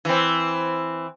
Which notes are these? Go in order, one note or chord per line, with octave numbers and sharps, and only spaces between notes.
E3 C4